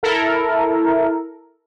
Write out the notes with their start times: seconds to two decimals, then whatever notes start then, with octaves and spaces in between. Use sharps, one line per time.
0.03 E4 A4 A#4